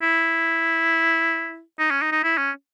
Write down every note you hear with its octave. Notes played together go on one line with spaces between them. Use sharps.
E4
D#4
C#4
D#4
D#4
E4
C#4